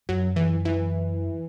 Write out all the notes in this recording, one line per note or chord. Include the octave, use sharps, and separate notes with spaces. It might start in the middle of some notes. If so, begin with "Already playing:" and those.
F#2 F#3
E3
E3